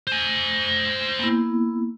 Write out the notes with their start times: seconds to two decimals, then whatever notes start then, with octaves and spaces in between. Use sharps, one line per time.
0.07 C5 G#5
1.19 A#3 B3 E4